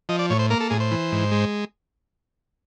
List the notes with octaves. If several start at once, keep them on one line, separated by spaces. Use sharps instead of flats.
F3 D#5
D5
A2 C#5
C5
A#3 A#4
A4
A2 G#4
C5
E3
G#2
G#3